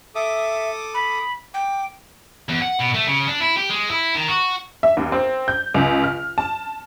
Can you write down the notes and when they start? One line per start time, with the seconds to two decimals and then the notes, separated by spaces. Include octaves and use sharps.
0.15 A4 E5 D6 D#6
0.94 B5
1.54 G5 D6
2.49 E2
2.61 F#5
2.79 B2
2.94 A3
3.07 C#3
3.28 D4
3.41 E4
3.57 G4
3.70 G#3
3.89 E4
4.15 D#3
4.28 F#4
4.83 E5
4.97 D#2
5.12 C4
5.48 G6
5.74 C#2
6.04 F6
6.38 A5